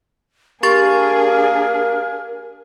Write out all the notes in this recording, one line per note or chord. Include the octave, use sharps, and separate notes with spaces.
A#3 D4 G4 G#4 A#4 C#6 A6